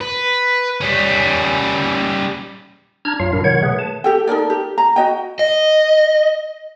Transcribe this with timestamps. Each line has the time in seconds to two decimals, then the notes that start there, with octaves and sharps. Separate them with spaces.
0.01 B4
0.81 G3 C#4
3.05 D4 A#5 F6 G#6
3.20 F#2 F#3 F4 F5
3.33 A#2 D4 E4 A#4
3.44 B2 D#3 F#3 C#5 F#5 G#6
3.63 A3 G#4 B4
3.79 A5
4.04 G4 A4 G5
4.27 D#4 A4 A#4 D5
4.50 G4
4.78 A#5
4.96 F#4 D#5 G5
5.39 D#5